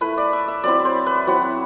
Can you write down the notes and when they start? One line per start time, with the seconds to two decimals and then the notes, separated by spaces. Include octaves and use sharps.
0.01 A3 E4 B4
0.17 D5
0.33 E5
0.48 E5
0.64 F#3 C4 E4 D5
0.85 C5
1.06 B4
1.27 F#3 C4 E4 F#4